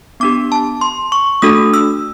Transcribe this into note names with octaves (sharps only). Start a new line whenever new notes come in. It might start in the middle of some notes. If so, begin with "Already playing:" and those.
B3 D4 G4 D6
A5
C6
C#6
A3 D4 F#4 A4 D#6
E6